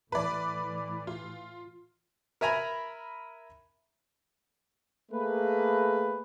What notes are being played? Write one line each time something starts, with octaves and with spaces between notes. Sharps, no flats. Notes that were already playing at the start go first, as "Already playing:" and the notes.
A2 E3 B4 D5
F4
A#4 E5 G#5 A#5 B5
A3 A#3 G#4 B4